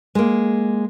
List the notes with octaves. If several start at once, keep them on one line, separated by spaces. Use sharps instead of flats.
G#3 A#3